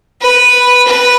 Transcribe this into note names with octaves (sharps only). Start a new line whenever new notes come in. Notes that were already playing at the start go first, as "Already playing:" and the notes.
B4
B4